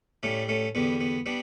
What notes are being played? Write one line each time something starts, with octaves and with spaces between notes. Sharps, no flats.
A2 G3 A3 C#4
A3 C#4
E2 D3 G3 B3
B3
G3 B3 D4